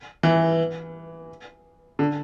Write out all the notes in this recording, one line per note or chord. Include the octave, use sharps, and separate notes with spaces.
E3
D3